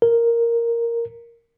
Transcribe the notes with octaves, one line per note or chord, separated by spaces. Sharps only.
A#4